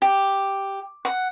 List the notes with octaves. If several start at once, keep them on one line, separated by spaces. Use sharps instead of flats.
G4
F#5